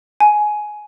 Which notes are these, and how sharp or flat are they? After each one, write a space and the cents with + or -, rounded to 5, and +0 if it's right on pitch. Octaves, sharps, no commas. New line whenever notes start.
G#5 +15